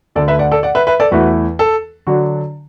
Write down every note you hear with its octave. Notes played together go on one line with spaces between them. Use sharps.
D2 D3 A3 A4 D5
B4 E5
D5 F#5
A4 D5
D5 F#5
B4 E5
B4 E5
A4 D5
E2 E3 A3 E4 F#4 B4
A4
D3 F#3 D4 F#4